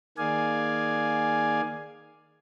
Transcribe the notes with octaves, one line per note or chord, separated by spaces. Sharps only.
D#3 A#3 G#4 D5 F5 G#5